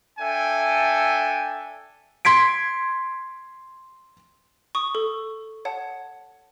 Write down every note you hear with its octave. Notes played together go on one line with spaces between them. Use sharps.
D4 A4 E5 G5 G#5
C6 G#6 B6 D7
C#6 D#6
A4
C#5 F#5 A5